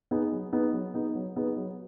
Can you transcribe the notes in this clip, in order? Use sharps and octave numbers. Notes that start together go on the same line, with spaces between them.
B3 D#4 G#4 B4
F#3
B3 D#4 G#4 B4
F#3
B3 D#4 G#4 B4
F#3
B3 D#4 G#4 B4
F#3